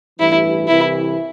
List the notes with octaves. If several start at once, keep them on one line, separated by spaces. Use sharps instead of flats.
A1 G2 E3 E4
C2 C3 E3 E4